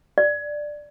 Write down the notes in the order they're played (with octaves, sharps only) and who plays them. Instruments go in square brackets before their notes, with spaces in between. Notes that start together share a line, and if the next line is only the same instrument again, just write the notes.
[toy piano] D5